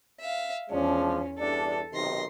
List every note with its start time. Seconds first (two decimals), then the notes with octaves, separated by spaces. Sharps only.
0.19 E5 F5
0.70 E2 F3 G#3 C#4 D4
1.39 E2 G2 D4 A4
1.93 B1 C3 D#3 C6 A#6